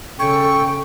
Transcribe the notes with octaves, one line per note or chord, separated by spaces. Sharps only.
C#3 A4 G5 C#6